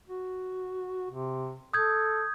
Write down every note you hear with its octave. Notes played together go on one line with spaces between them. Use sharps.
F#4
C3
A4 D#6 G6 G#6